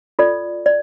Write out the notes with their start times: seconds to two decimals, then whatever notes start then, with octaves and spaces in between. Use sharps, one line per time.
0.19 F4 A4 D5
0.66 D5